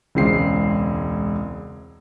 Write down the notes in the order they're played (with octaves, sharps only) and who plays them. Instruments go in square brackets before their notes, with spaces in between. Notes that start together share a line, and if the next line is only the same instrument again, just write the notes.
[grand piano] E1 C#2 C4 C7